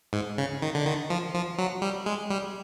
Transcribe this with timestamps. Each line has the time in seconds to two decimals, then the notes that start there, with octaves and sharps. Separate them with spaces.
0.13 G#2
0.38 C#3
0.62 D#3
0.75 D3
0.86 D#3
1.10 F3
1.34 F3
1.58 F#3
1.82 G3
2.06 G#3
2.30 G3